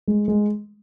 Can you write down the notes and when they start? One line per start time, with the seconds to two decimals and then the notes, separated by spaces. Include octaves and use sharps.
0.08 G#3
0.28 G#3